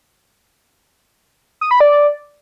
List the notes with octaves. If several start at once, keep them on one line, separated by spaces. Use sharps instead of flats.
D#6
B5
D5